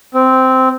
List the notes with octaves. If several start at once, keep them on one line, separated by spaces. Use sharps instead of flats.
C4